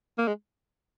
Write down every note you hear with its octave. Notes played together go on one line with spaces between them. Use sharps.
A#3
G#3